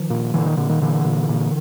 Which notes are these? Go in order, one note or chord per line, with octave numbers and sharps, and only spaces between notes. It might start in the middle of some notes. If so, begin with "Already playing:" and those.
Already playing: D#3 F3
A#2
A#2 D3 E3
D#3
A#2 D3
D#3
A#2 D3 E3
A#2
A#2